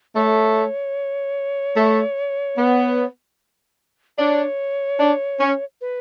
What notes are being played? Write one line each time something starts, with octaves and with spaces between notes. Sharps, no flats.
A3 C#5
A3
B3
D4 C#5
D4
C#4
B4